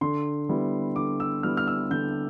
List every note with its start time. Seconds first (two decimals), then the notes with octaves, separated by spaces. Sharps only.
0.01 D3 C6
0.49 G3 B3 E4
0.96 D3 D6
1.20 E6
1.43 G3 B3 E4 F6
1.57 F6
1.67 E6
1.91 D3 G6